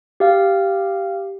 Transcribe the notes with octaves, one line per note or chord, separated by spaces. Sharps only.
G4 F5